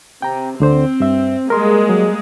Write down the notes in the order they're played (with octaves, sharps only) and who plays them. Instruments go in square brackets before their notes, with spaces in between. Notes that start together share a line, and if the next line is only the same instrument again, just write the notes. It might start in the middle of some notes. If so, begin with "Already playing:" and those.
[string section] C3 [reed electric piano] G5 A#5
[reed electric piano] D2 D3 C5 [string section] C4
[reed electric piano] G2 E5
[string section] G3 G#3 A#3 [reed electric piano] A#4 C6
[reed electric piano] F#3